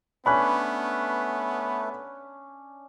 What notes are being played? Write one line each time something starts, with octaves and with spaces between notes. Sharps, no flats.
A3 B3 C#4 D4 B4 B5 F#6